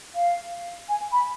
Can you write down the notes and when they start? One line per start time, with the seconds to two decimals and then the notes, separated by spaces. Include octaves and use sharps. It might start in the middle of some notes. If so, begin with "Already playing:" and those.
0.14 F5
0.88 G#5
1.12 B5